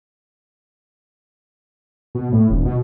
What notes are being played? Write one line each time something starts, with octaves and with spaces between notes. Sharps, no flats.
B2
A2
D#1
B2